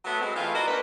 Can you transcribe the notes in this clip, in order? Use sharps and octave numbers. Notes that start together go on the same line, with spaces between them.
F#3 A3 B3
F#3 G#3 C4
E3 A3 F4
F#4 A#4 C5 D5 D#5
D2 A#3 B4